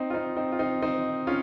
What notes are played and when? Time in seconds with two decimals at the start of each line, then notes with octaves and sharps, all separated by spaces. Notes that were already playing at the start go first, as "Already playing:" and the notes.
Already playing: C4 D#4
0.10 F4
0.14 C4 D#4
0.36 C4 D#4
0.52 F4
0.59 C4 D#4
0.82 C4 D#4
1.27 C#4 F4